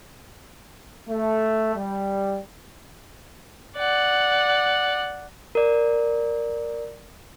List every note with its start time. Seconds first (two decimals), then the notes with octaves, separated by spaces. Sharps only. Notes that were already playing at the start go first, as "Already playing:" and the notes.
1.09 A3
1.76 G3
3.77 D5 F#5
5.55 A#4 D5